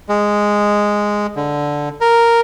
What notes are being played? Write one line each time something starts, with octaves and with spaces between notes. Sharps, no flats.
G#3
D3
A#4